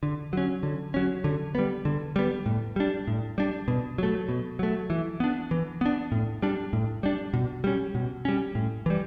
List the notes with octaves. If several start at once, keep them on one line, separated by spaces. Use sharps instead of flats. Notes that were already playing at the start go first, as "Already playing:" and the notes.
D3
F#3 C#4
D3
F#3 C#4
D3
G3 B3
D3
G3 B3
A2
G3 D4
A2
G3 D4
B2
F#3 A3
B2
F#3 A3
E3
B3 D4
E3
B3 D4
A2
G3 D4
A2
G3 D4
B2
G3 C#4
B2
G3 C#4
A2
E3 G3